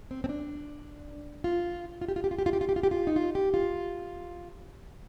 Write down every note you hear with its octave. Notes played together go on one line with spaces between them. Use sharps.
C4
C4
D4
F4
F4
G4
F4
G4
F4
G4
F4
G4
F4
G4
F4
G4
F4
D#4
F4
G4
F4